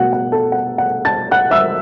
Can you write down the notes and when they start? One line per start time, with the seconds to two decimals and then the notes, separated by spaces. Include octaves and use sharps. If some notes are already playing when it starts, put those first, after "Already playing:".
Already playing: B2 F#3 A3 F#5
0.13 F#5
0.32 A4 A5
0.52 F#5
0.78 F#5
1.05 A5 A6
1.31 F#5 F#6
1.51 E5 E6